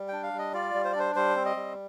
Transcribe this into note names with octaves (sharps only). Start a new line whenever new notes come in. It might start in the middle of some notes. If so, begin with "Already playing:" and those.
Already playing: G3
D4 G5
F5
G3
D#5
F4 D5
G3
C5
D5
D4 C5
G3 C5
C4
D#5
G3